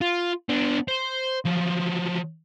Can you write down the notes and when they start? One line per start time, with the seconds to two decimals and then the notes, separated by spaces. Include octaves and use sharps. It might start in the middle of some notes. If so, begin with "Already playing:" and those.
0.01 F4
0.49 B3 D4
0.88 C5
1.46 F3 F#3